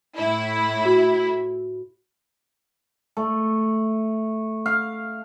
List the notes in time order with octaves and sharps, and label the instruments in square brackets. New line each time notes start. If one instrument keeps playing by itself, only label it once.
[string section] A2 E4
[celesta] F#4
[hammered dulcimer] A3
F5